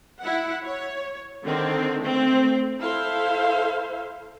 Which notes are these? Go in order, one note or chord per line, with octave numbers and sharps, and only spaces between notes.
E4 F#5
C#5
D3 D#3 C4
A3 C4
E4 A4 C5 E5 F5